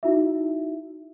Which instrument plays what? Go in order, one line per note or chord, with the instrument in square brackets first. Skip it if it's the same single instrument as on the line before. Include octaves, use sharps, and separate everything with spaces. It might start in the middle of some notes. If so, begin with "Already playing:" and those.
[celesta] D#4 E4 F#4 E5